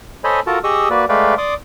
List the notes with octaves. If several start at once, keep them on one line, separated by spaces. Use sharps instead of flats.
A4 C5 C#5 D#5 G#5 B5
F4 F#4 A4 A#4 A5 A#5
G4 G#4 D#5 C#6 D#6 E6
A#3 F#4 B4 D5
G#3 A3 B4 D5 F5 G5
D5 C6 D6 D#6